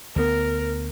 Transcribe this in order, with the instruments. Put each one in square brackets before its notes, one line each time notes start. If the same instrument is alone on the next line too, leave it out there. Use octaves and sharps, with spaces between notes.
[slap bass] D2 B3 [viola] A#4